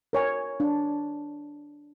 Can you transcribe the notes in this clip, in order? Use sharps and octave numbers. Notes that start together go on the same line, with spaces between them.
A#4 C#5 G#5
D4